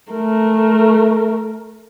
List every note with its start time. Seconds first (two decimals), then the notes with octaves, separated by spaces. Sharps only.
0.12 A3 A#4